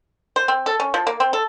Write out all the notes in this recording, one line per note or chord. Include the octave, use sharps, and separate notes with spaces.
C5
C4
A4
C#4
F3
A#3
C4
A4